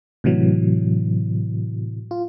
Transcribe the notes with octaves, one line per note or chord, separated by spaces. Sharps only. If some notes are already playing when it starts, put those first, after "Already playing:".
A2 C3 E3 F#3
F4